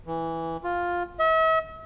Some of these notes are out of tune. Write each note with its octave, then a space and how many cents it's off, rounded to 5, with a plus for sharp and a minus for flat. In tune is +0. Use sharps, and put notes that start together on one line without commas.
E3 -5
F4 +5
E5 -40